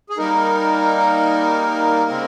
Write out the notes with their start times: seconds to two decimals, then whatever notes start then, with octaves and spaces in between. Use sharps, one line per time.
0.10 G#4
0.18 G3 A#3 D#4 A#4
2.08 C#3 G#3 C4